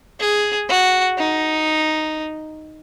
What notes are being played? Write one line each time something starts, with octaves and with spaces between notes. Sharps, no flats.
G#4
F#4
D#4